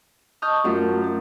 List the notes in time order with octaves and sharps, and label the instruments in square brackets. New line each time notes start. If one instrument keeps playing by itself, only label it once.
[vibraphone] D#5 A5 C#6 [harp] D#6 F6 G6
[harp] F#2 F4 [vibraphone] A3 C#4 A#4
[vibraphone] F#4